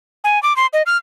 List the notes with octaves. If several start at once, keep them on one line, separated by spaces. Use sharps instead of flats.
G#5
D6
C6
D#5
F6